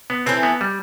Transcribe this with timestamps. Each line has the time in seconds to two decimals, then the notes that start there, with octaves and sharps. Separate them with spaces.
0.10 B3
0.26 E3 A3 C4 E4
0.43 B3
0.61 G3